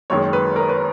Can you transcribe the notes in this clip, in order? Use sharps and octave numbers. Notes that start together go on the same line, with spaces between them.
F#1 F#2 D#3 G#3 C#5
B4
A#4
B4